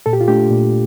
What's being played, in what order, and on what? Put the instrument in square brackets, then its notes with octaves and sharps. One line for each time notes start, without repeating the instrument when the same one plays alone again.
[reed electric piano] A#2 A4
G4
F4
A3 D4 G4
A#2